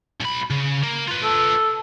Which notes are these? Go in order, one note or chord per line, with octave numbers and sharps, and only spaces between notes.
B1 B5
C#3
A#3
F4 B4
A4